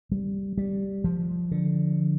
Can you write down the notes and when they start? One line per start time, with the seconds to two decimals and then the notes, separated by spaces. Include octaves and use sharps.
0.11 G3
0.58 G3
1.04 F3
1.51 D3